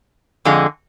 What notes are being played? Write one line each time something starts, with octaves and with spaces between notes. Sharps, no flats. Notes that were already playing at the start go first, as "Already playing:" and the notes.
F2 D3 G#3